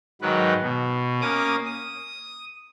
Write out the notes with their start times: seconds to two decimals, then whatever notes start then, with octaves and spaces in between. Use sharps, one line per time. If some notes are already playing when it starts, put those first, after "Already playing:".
0.22 G#2 D#3 F#3 B4
0.63 B2
1.21 A#3 C#4 D6 D#6
1.66 D#6